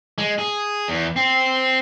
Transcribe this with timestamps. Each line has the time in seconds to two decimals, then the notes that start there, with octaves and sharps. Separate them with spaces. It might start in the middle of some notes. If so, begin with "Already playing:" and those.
0.18 G#3
0.38 G#4
0.88 E2
1.16 C4